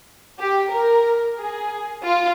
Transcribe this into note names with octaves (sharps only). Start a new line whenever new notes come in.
G4
A#4
G#4
F4